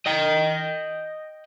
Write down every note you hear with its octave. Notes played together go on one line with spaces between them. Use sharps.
D#5 G5